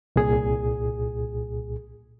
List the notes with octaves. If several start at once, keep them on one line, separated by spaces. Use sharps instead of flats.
C2 A#2 G#4